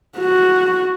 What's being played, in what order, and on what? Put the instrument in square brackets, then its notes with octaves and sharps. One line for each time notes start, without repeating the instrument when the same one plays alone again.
[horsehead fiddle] F#4